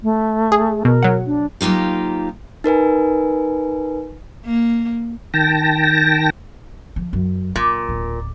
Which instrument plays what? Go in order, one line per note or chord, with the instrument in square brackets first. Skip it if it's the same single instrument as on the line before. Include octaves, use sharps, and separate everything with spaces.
[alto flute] A3
[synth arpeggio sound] G#4
[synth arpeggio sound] B2 [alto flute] A#4
[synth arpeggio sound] F#3 F#5
[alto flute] D4
[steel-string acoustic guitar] F#3 A#3 D#4 F4 G4
[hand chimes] D#4 A#4 B4 G#5
[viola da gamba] A#3
[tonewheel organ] D#3 G5 A5 A#6
[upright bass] F3
F#2
[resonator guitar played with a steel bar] A#2 [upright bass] A#3
[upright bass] D1